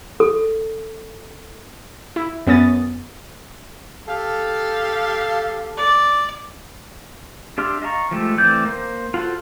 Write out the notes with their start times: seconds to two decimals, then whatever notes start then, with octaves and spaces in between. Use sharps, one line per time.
0.20 A4
2.16 E4
2.47 F#2 B3 C#4 D#6 A6
4.08 G4 A4 F5
5.77 D5
7.58 D4 G4 E5 C6 F6
7.82 D#5 F5 A5 A#5 C#6
8.11 F3 G#3 A3 G4 A4
8.38 E3 A3 C4 D5 G6
8.65 A#3 C5
9.14 F4 F#4 A4 C5